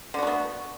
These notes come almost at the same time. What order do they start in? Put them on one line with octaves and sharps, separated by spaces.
D3 F#4 A3 B3